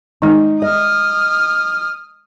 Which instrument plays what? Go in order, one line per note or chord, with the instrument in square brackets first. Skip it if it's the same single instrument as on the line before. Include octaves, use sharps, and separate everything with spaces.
[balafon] D#3 G#3 [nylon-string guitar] D#4
[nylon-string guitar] D#5 [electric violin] D#6 F6